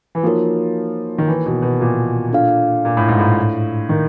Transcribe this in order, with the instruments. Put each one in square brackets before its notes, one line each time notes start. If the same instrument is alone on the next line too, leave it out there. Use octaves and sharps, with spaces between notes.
[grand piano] E3
[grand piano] F3 [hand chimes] A#3 D#4 F#4 A#4 C#5
[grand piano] D#3
E3
B2
B2
A#2
[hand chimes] D4 F4 A4 D5 F5
[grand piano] A#2
A2
G#2
A2
D#3